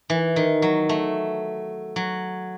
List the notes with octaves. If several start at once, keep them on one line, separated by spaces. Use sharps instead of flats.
E3
D#3
F#3
A3
F#3